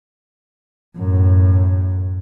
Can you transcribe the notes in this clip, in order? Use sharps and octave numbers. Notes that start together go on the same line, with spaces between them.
F#2 A2